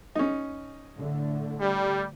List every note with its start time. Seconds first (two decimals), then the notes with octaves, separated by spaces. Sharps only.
0.15 C#4 D#4
0.96 A2 D3 A3
1.61 G3